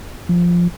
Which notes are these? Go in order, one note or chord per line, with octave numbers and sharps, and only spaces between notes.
F3